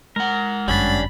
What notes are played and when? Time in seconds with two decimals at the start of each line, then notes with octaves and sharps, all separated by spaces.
0.16 G#3 A#4 F#5
0.68 G1 F#2 G3 C#4 D4 B5 A6